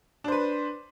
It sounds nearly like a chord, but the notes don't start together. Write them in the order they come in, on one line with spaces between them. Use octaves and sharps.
D4 C5 B4